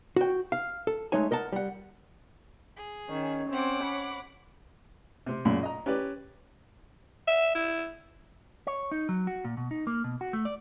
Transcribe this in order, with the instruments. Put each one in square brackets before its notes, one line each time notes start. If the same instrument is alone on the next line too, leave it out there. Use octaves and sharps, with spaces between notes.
[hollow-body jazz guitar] F#4 G5
F5
A4
G#3 A3 D#4 C#5 G#5
A#4 D#5 F#5 A5
G3 F#5
[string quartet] G#4
[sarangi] D#3 [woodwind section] C#4 C#5
[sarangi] C4 [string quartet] F#5 D6
[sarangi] B5
[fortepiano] C3 C4
A#1 F#2 A#2 C#3 B5
D#5 A#5
C#4 G4 B4 D5
[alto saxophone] E5
E4
[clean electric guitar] C#5
D#4
F#3
F#4
A#2
B2
D#4
A#3
B2
F#4
A3
D5